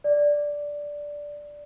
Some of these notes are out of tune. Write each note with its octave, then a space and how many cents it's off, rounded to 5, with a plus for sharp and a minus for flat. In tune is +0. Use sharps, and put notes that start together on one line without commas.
D5 -5